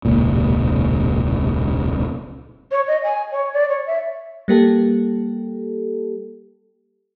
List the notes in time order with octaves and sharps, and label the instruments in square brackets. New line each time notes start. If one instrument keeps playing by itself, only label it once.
[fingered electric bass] E1 C#2 A#2
[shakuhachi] C#5
D#5
G#5
C#5
D5
C#5
E5
[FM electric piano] G3 A#3 G4 A4